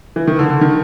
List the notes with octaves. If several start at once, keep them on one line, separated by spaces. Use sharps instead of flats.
E3
D#3
D3
D3
D#3